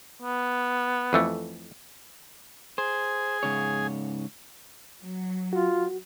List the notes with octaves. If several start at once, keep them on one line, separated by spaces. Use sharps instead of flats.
B3
F2 E3 A3
G#4 C5
G#2 C#3 C#5
F#3
F4 F#4